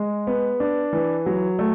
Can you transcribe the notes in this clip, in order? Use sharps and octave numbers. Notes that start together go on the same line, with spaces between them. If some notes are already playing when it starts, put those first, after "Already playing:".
Already playing: G#3
B3
D4
E3
F#3
A3